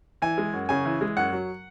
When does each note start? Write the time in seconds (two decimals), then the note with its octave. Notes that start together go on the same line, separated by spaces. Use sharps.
0.22 E3 G#5
0.38 G#3
0.53 F#2
0.69 C#3 G#5
0.85 E3
1.01 G#3
1.17 F#2 F#5
1.33 F#3